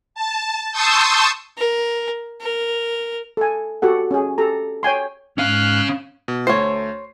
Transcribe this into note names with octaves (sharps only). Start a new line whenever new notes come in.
A5
A5 C6 C#6 D#6 E6 G6
A#4
A#4
A4 G#5
F#4 G4 A4 F#5
C#4 G#4
G4 A4 A#5
C#5 G5 G#5 C6
G#2 C#4 F5 F6 F#6
B2
D2 A3 C5 C#5 C7